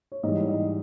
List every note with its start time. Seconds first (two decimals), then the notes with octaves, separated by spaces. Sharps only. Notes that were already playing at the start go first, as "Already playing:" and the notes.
0.12 C#5
0.23 G#2 E3 G3 D#5
0.49 D#5